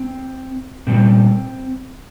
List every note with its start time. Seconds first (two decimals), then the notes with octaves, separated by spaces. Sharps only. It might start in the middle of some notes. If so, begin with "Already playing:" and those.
Already playing: C4
0.87 A#2 G3 C4